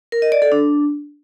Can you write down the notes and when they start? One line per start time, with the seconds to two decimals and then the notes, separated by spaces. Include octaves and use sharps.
0.12 A#4
0.22 D#5
0.32 D5
0.42 A4
0.52 D4